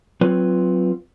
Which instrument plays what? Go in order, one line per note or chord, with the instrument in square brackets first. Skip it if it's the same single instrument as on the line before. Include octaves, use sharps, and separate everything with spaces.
[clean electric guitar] F#3 C4 F4 B4 C#5